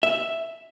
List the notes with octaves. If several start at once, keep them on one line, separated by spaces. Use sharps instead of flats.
E5